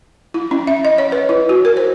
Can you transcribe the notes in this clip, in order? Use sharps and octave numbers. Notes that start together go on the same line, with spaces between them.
E4
C#4
E5
D#5
C#5
B4
E4
F#4
A#4
C5